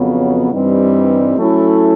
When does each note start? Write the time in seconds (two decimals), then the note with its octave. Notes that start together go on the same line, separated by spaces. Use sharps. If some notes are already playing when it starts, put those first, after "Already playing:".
Already playing: F2 C#3 F#3 B3
0.51 G2 E3 G3 C4 D#4
1.37 F#3 A3 C#4 E4 A4